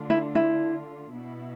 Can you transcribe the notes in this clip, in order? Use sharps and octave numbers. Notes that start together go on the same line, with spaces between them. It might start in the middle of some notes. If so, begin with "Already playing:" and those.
Already playing: D3 A3 D4 F4
E4
E4
B2 B3 E4